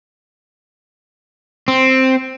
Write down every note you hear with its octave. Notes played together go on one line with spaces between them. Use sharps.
C4